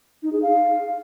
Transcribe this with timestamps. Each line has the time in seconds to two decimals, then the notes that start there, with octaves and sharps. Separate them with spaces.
0.23 D#4
0.32 G#4
0.42 F5